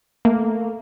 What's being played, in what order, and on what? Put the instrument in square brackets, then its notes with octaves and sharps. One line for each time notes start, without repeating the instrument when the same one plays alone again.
[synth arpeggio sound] A3 A#3